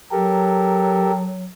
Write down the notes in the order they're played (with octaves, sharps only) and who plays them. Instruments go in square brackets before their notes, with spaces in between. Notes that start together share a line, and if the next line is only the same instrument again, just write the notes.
[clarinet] F#3 [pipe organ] G4 A4 A#4